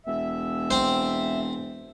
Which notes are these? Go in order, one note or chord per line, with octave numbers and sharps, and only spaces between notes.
E1 E5
C4 C5